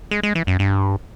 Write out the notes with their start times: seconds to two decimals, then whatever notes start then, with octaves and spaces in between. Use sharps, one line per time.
0.11 G#3
0.23 G#3
0.35 E3
0.47 F#2
0.59 G2